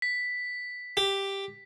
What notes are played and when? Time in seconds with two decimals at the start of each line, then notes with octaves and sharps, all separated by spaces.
0.02 B6
0.97 G4